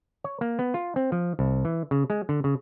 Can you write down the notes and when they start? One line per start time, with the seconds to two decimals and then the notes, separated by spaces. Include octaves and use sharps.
0.24 C#5
0.41 A#3
0.59 B3
0.74 F4
0.96 C4
1.12 F3
1.39 C2
1.65 E3
1.91 C#3
2.10 G#3
2.29 D3
2.44 C#3